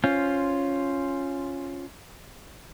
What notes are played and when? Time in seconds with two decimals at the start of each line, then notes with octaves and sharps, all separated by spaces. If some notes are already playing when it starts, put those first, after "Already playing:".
0.04 C#4 F4 C5